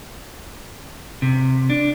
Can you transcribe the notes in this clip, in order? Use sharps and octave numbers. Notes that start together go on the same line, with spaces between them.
C3
D4